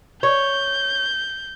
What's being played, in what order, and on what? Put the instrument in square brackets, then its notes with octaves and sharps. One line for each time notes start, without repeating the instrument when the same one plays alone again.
[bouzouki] C#5 [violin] G6